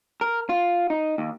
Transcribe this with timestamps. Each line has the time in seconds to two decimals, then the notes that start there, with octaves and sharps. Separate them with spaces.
0.21 A#4
0.49 F4
0.90 D#4
1.18 D#2